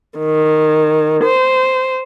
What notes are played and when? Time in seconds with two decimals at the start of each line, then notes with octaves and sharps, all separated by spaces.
0.18 D#3
1.23 C5